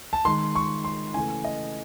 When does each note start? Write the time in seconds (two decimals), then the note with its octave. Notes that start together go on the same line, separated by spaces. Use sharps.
0.13 A5
0.25 D#3 G#3 C6
0.55 C#6
0.84 C6
1.14 C#3 E3 A3 G#5
1.45 D#5